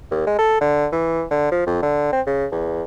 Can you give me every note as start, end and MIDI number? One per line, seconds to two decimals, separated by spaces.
0.11 0.22 39
0.27 0.36 56
0.39 0.60 69
0.61 0.87 50
0.92 1.23 52
1.31 1.51 50
1.52 1.63 53
1.67 1.77 41
1.83 2.12 50
2.13 2.21 60
2.27 2.46 49
2.52 2.83 40